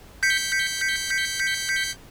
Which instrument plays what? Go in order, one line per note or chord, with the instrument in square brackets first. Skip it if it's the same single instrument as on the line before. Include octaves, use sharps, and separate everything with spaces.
[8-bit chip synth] G6 B6 C#7